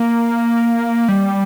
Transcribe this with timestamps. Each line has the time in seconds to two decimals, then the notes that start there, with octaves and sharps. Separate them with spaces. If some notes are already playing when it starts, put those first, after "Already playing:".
Already playing: A#3
1.08 G3